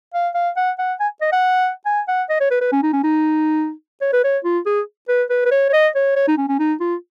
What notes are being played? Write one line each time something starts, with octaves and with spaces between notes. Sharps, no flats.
F5
F5
F#5
F#5
G#5
D#5
F#5
G#5
F#5
D#5
C#5
B4
B4
C#4
D#4
C#4
D#4
C#5
B4
C#5
F4
G#4
B4
B4
B4
C#5
C#5
D#5
C#5
C#5
D#4
C#4
C#4
D#4
F4